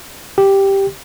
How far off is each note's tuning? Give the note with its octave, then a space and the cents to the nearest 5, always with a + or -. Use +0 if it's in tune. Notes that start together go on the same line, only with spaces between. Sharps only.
G4 +0 G5 +0